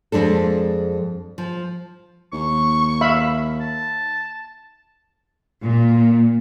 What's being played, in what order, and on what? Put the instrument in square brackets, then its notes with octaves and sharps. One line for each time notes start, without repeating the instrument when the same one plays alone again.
[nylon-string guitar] F2 G#3 D4 A4
F3
[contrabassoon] D#2 [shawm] C#6
[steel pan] E5 F5 B5
[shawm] A5
[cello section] A#2